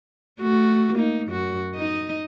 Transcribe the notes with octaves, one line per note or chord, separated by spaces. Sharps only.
A3 F#4
A#3 D#4
F#2 F#4
D#4 D#5